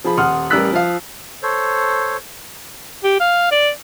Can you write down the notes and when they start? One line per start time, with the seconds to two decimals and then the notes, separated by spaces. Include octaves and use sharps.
0.04 F3 G#4 B5
0.17 D#1 F#5 C6 D#6 F6
0.50 A1 G3 A#4 E6 F#6 B6
0.73 F3 F5
1.43 A4 C5 C#5
3.04 G4
3.20 F5
3.51 D5